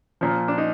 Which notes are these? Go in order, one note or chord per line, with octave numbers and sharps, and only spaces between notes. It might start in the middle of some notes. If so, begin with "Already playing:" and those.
A#2 F3
D4
D#4